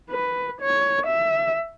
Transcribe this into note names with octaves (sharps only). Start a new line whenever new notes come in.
B4
C#5
E5